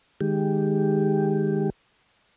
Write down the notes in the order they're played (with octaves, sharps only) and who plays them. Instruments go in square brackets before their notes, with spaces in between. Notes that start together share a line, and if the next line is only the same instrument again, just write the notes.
[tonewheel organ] D#3 G#3 G4